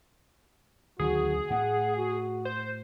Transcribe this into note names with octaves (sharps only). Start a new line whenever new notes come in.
D2 D#3 F#3 F#4 G#4
A2 F#5
F#4
C5